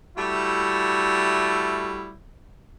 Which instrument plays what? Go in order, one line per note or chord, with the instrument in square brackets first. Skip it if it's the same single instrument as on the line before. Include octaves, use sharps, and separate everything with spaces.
[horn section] G3 A3 E4 F#4